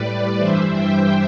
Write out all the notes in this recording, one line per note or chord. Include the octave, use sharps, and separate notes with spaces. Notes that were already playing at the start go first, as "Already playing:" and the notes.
Already playing: A2 G3 B4 D5
G2 E3 G3 C5 E5
E5 G5